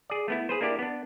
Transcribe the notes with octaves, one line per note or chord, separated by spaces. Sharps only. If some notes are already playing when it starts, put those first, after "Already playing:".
G#4 D5
A3 B3 E4
G#4 B4 C5
A#3 D4 E4 G4 D5
B3 D4